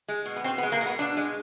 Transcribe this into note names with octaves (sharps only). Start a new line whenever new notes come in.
G#3
B2
B3
B2 C4
B3
G#3
A#3
B2 B3
B2 D4
G#3